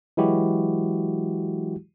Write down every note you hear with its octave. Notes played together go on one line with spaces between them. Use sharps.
E3 F#3 G#3 E4 F#4 G4